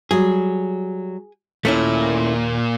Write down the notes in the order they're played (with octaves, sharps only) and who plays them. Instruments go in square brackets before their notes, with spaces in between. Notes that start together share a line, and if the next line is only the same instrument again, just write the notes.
[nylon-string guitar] F#3 G3 [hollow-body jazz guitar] G#4
[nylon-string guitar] D#2 [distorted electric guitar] A#2 [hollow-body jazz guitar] A3 C#4 E4